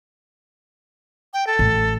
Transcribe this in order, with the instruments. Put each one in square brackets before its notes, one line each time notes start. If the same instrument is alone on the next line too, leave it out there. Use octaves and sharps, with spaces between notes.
[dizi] G5
A4
[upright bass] A1